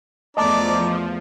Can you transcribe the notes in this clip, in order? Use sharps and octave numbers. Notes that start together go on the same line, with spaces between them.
E2 F3 A3 D4 D#5 A5 A#5 D6